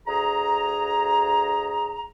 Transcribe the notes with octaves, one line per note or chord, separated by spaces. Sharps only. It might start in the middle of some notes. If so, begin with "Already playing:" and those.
D2 G#4 A#5